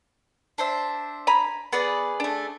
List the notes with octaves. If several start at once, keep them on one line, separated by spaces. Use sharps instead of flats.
D4 C5 E5
G#5 A#5 B5
B3 G#4 B4 D5
A3 D4